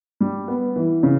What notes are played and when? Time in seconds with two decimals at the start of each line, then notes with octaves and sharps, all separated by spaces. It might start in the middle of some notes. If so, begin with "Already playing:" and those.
0.21 G3
0.48 B3
0.76 E3
1.03 C#3